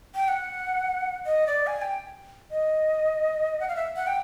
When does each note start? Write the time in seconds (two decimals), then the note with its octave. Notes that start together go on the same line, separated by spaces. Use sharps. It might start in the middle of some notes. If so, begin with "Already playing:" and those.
0.15 G5
0.28 F#5
1.26 D#5
1.47 D5
1.67 G#5
1.82 G5
2.51 D#5
3.60 F#5
3.69 F5
3.76 E5
3.96 F#5
4.07 G5